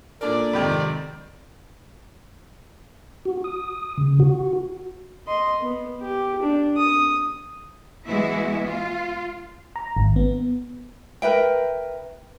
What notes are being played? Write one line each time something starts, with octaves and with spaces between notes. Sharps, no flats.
A#2 D4 A4 A#4 D5
F2 G#2 C3 D#3 G5 B5
F#4
D#6
C#3
F#4
D#5 C6
B3
G4
D4
D#6
E3 G#3 B3 E4 F#4 E5
F4
A#5
G#1
B3
A#4 B4 E5 G5